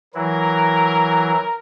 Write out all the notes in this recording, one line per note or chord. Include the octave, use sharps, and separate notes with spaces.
E3 F#3 E4 A#4